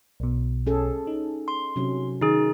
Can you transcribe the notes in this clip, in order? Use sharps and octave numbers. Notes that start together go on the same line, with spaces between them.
B1 B2
C#4 G#4 A4
D#4
C6
C3 F#3 C#4
D#3 D#4 G#4